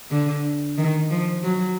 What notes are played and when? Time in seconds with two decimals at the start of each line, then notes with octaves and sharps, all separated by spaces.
0.11 D3
0.78 D#3
1.11 F3
1.44 F#3